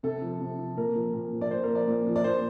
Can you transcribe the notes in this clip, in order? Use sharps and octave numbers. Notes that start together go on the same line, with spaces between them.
C3 A4
F3
C3
F3
A#2 A#4
F3
A#2
F3
D5
A#2 C5
A#4
F3
D5
A#2
F3
D5
A#2 C5